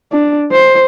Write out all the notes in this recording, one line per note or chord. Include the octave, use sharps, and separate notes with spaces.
D4
C5